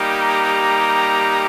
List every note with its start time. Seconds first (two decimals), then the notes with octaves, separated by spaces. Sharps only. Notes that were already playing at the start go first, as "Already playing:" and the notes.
Already playing: G3 A#3 D#4 G4
0.16 A#5